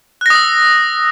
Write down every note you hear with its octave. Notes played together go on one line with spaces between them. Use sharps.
D#6 E6 F#6 A#6